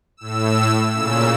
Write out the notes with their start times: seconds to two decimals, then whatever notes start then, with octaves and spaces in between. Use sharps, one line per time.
0.17 A2 E6
0.92 A#2 C#3 E6